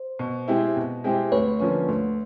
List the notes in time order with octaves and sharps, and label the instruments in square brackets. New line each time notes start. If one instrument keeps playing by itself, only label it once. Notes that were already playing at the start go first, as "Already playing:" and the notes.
Already playing: [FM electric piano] C5
[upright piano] B2
G#3 C4 E4 G4
B2
G#3 C4 E4 G4
[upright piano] D2 [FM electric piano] B4 C#5
[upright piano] D3 F3 A#3 C#4
D2